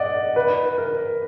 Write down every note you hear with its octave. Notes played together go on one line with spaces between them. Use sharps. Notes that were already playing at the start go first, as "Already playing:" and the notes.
Already playing: D5 D#5 F#5
B4
A#4